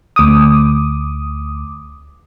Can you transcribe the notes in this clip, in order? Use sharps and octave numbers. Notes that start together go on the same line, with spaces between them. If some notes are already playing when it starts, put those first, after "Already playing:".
D2 D6 D#6